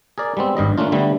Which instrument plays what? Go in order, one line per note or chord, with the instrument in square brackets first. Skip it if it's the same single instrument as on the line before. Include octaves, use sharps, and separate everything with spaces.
[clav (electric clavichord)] G#4 A#4 D5
G3 G#3 B3 C4
G#1 G2 G3 D#5
A3 A#3 C#4 D4 F4
D3 G3 A3 B3